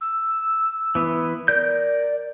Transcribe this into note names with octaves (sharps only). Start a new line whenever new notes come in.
E6
E3 B3
A#4 D5 G6